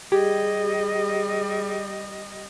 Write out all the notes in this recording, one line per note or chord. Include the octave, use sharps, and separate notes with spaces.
G3 G4 G#4 D#5